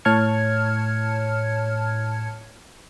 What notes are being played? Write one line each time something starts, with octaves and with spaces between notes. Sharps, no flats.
A2 C#5 A5 F6 G#6 C#7